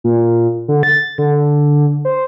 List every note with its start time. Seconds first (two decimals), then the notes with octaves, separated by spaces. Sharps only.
0.04 A#2
0.68 D3
0.83 A6
1.18 D3
2.05 C5